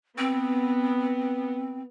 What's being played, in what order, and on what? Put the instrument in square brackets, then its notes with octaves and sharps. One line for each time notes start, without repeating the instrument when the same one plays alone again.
[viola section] B3 [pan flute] C4